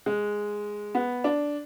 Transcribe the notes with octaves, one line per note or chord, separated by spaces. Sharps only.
G#3
B3
D4